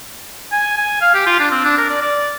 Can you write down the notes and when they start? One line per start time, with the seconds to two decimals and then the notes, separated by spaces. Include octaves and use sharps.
0.52 G#5
0.77 G#5
1.01 F5
1.15 G4
1.26 F4
1.39 D4
1.51 C4
1.65 D4
1.77 A#4
1.90 D5
2.01 D5